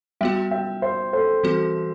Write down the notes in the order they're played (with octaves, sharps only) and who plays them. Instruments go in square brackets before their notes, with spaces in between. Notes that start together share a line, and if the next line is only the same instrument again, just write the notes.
[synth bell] G3 B3 F#4 [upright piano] E5 G5
[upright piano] E5 G5
C5 E5
A4 C5
[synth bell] E3 G3 C4 F#4